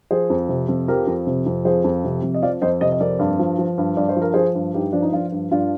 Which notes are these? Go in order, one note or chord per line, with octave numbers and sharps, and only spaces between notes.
F3 G#4 C5
F2
C3
F2
F3 G4 A#4
F2
C3
F2
F3 G#4 C5
F2
C3
F2
D#5
F3 D5 F5
F2 C5 D#5
C3 C5 D#5
D#5
F2 A#4 D5
G2
F3
F3
G2
G2 D5
C5
F3
A#4
F3 G#4 C5
G2
G2 D#4 G4
F3 D4
D#4
F3 D4 F4
G2
G2 D4 F4